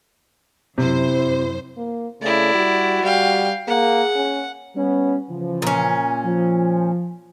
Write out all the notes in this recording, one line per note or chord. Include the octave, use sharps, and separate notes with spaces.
F#2 C3 E4 C5
A#3
C#3 A3 E4 D5
G3 F#4
G3 F5 G5
A#3 G#4 F#5
C#4
G3 B3 C#4
C#3 E3 F3
A#2 C#4
F3